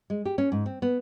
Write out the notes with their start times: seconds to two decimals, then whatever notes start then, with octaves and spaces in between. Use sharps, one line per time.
0.10 G#3
0.25 G4
0.38 C#4
0.52 G#2
0.66 C4
0.82 B3